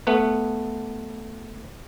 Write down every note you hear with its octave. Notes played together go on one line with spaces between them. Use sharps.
A3 B3 B4